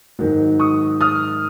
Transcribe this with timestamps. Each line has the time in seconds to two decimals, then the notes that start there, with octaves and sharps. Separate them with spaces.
0.19 G#2 D#3 F#3
0.60 C#6 D#6
1.01 D#6 F6